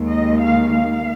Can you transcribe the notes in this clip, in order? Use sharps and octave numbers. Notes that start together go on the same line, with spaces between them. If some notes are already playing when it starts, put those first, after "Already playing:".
Already playing: D#2 D#3 G#3
D#5
F5
F5